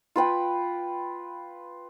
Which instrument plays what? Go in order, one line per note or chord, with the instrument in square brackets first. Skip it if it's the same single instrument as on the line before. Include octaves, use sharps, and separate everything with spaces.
[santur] F4 B4 G5